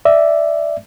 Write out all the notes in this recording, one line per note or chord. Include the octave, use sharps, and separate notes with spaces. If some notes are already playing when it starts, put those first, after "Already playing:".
D5 E5